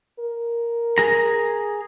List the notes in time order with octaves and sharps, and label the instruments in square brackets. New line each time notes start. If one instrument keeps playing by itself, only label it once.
[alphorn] A#4
[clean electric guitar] G#4 A#5